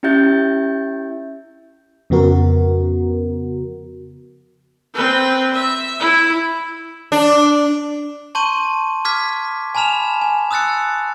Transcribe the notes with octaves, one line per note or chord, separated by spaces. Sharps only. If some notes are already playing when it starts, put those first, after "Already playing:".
C#4 E4 G4 E5 G6 A6
F2 C#3 B3 F#4 A#4
C4 B4
E5
E4
D4
A5 C6 C#6 G6 D#7
D6 F6 G#6 B6
G#5 A5 B5 F6 E7 F7
G#5
D#6 E6 F#6 A6 C#7